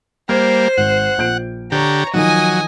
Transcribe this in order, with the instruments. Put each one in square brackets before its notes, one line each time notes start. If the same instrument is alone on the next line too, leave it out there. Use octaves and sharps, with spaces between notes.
[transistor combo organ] G3 A#3 [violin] C5 [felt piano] F6 G#6
[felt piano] G#1 [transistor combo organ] F#5
[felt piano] A#1 G6 D7
[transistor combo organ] D3 G4 [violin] C#5 A#5
[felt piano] D#3 F3 D#4 [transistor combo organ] F#3 [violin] D#5 G#5